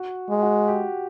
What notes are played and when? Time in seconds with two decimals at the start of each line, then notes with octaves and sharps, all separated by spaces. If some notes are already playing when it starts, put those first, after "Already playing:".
Already playing: F#4
0.30 G#3
0.42 F#4
0.68 G4